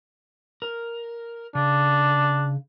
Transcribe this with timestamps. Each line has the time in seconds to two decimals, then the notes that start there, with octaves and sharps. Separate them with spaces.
0.62 A#4
1.55 C#3 D4